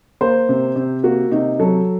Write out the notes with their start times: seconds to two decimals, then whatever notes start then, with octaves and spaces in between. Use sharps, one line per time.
0.21 A#3 C5
0.49 C3
0.76 C3
1.03 A#3 F#4
1.31 C3 D#4
1.59 F#3 A4